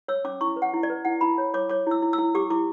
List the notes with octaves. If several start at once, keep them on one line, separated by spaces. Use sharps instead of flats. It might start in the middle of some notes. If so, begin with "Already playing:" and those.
C#5 E6
C#4 D6
E4 C#6
B4
F#5
E4
D5
B4
E4 F#5
E4 B5
C#5
C#5 D6
C#5 D6
E4 E6
E4
E6
E4
G4 D6
E4 D6